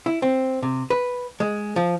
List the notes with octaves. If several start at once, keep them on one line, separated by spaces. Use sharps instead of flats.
E4
C4
C3
B4
G#3
F3